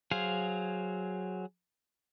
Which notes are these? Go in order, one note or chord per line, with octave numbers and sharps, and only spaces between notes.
F#3 G#4 C5 F5